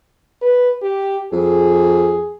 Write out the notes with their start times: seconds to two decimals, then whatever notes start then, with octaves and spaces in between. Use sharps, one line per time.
0.41 B4
0.82 G4
1.32 F2 G#4